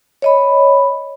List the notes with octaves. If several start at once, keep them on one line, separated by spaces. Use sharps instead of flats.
C#5 D#5 B5